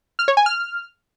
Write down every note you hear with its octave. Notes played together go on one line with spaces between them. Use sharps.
F6
C#5
G#5
F6